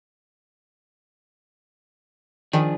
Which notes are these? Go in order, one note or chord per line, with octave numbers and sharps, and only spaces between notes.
D#3 F3 D4 G#4